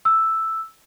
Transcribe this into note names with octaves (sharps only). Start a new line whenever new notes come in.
E6